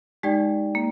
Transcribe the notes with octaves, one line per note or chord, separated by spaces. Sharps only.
G#3 D#4 G4 D5 G5
A#3